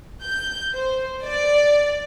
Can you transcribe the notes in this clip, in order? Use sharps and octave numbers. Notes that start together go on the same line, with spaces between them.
G6
C5
D5